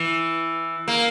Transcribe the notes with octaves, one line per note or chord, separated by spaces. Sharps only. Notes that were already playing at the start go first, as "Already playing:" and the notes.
Already playing: E3
A#3